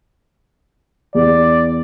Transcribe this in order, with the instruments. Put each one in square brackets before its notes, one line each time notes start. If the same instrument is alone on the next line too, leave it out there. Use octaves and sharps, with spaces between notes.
[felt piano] E2 [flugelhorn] D5